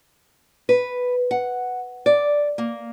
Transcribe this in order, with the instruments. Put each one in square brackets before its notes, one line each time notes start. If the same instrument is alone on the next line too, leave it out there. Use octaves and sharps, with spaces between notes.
[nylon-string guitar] B4
F#5
D5
A#3